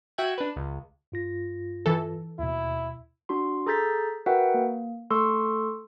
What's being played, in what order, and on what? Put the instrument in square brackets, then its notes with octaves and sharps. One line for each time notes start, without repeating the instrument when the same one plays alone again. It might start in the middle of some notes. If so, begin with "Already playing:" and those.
[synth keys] F#4 E5 G5 F#6 G#6
D4 B4
C#2
[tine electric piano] G2 F4 A#6
[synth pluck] E3 A4
[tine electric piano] D#2 B2 [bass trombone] E4
[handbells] D4 F#4 C6
G#4 A4 A#5 G6 A6 B6
F#4 A#4 B4 E5 F#5 G5
A#3
A3 A4 C6 C#6 E6